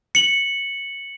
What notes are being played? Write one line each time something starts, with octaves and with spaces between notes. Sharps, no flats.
C#7 F#7